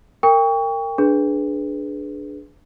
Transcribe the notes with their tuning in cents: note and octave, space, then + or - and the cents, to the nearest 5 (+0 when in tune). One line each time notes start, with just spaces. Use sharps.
A#4 -25 G5 +25 C#6 +25
D4 +0 G#4 +15 B4 +0